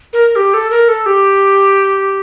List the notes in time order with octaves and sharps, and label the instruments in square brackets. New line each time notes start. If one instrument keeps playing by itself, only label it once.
[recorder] A#4
G4
A4
A#4
A4
G4